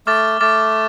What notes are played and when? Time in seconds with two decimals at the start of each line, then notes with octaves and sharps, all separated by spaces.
0.07 A3 D6 F6 A6
0.41 A3 D6 F6 A6